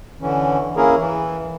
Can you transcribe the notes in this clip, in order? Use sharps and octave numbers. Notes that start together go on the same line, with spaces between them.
D3 E3 C#4
A#3 C#4 E4 G#4 A#4
E3